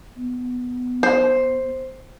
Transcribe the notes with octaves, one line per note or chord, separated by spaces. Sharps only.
B3
C5